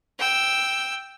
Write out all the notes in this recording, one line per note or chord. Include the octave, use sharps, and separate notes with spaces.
G5 E6